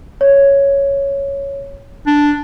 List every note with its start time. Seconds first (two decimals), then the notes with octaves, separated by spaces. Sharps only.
0.21 C#5
2.06 D4